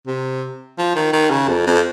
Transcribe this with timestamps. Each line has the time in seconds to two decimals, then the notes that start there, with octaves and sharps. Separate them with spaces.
0.07 C3
0.78 F3
0.95 D#3
1.13 D#3
1.30 C#3
1.48 F2
1.66 F2